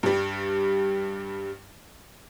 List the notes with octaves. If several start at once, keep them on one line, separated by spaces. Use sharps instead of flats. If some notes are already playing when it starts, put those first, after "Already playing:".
G2 G3